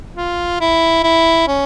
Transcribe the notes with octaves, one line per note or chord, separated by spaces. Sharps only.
F4
E4
E4
C#4